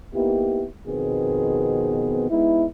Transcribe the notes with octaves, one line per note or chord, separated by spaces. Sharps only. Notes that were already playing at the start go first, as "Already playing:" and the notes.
A#3 B3 D#4 E4 G4
F2 B2 D#3 B3 C4 G#4
G#3 B3 D#4 E4